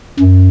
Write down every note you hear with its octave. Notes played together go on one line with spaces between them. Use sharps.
F#2